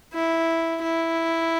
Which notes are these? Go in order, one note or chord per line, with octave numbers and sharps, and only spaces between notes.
E4
E4